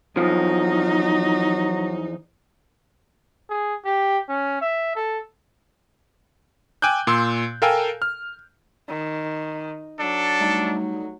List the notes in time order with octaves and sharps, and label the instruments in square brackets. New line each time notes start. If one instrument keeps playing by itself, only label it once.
[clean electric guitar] E2 F3 [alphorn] F#3 [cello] D#4
[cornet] G#4
G4
C#4
E5
A4
[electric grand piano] G5 G#5 D6 E6 F#6 G6
A#2 C6 E6
A4 A#4 F5 G5 G#5 E6
F6
[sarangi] D#3
[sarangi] F#3 [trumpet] D4 [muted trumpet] A4
[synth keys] G3 A3 D#4